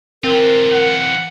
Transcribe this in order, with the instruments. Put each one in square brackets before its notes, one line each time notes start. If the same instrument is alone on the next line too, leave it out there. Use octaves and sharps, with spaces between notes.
[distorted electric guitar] E3 F4 [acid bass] C4 [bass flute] A#4
[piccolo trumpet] F#5